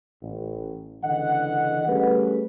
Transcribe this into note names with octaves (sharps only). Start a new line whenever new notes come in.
A1
C#2 D3 E3 D#5 F#5
G3 A3 C#4 G#4 B4